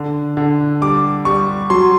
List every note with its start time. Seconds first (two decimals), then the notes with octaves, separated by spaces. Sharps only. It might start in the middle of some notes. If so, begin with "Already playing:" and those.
Already playing: D3
0.37 D3
0.82 G3 D6
1.25 G3 C#6
1.70 F#3 C6